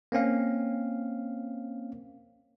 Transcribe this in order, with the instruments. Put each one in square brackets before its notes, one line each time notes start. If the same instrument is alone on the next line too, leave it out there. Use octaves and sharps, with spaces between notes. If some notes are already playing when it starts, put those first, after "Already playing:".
[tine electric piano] A#3 C4 C#4 F5